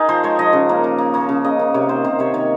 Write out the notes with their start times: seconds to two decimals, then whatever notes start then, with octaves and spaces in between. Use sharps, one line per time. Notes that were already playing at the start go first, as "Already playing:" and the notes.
Already playing: D#4 G#4 A#4
0.09 F3 C5
0.23 G#3 C#5
0.39 F3 D#5
0.53 C#3
0.69 A#3
0.84 A#3
0.98 A#3
1.14 A#3 C#5
1.29 C#3
1.44 C#3 D#5
1.59 A#3
1.74 C3 C#5
1.89 D#3 C5
2.04 C3 C5
2.19 C3 C#5
2.34 D#3 C#5